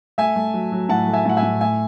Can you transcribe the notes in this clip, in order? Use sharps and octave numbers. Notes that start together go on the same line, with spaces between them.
A3 E5 G#5
A3
F#3
F#3
A2 F#5 A5
A3
E5 G#5
A2 F#5
E5 G#5
A2
A3 E5 G#5